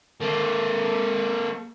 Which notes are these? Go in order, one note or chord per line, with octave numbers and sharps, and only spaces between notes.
A#3 A4